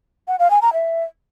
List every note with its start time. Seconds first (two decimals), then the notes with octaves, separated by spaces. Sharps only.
0.28 F#5
0.39 F5
0.51 G#5
0.62 A#5
0.73 E5